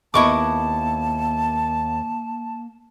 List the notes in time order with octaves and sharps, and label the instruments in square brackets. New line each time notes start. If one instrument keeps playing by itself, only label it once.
[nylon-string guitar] D#2 B3 D#5 [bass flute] A#3 [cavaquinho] E4 C#6 D6 [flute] A5